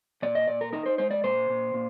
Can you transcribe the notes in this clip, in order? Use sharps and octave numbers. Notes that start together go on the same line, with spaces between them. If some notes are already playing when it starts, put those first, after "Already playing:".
A#2 D5
D#5
A#2 D5
A#4
D#4 A#4
C5
G#3 C5
D5
A#2 C5
A#2
A#2